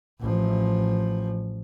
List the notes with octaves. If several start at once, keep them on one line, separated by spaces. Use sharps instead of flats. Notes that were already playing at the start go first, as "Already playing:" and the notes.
A1 F3